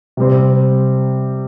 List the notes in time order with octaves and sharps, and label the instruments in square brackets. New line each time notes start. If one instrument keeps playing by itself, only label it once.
[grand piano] C3 G3 C4